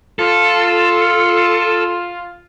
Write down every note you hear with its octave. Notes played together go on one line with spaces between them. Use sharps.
F4 A4